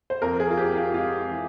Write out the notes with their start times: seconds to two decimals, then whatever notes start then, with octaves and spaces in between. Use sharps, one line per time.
0.10 C5
0.22 F2 A#4
0.40 G#4
0.50 F4
0.57 C4 G4
0.76 F4
0.94 G#3 F4
1.30 E3